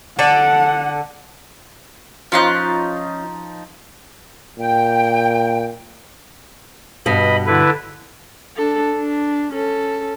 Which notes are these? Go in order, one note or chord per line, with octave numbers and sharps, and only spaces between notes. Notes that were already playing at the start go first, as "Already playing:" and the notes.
D3 A4 D5 F#5
F3 C#4 D#4 F4 F#6
A#2 G5
G2 B2 D#5 B5
D3 E4 B4
D4 A4
D4
C#4 A4